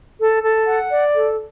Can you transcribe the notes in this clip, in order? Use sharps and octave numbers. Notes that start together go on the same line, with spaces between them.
A4
A4
F#5
D5
A4